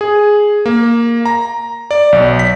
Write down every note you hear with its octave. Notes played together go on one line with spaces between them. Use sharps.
G#4
A#3
A#5
D5
B1
B6